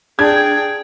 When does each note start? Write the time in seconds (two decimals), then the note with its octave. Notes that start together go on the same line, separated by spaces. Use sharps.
0.19 D4 G#4 G5 G#6